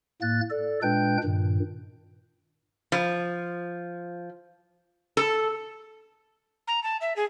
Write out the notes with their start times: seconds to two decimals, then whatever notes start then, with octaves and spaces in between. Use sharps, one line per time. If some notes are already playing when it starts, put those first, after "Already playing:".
0.22 A2 A#3 F#6 A6
0.50 A4 D5
0.83 A#2 G#3 D4 B4 G5 G6
1.23 G2 A#2 D#3
2.92 F3
5.17 A4
6.67 A#5
6.83 A5
7.01 E5
7.16 G#4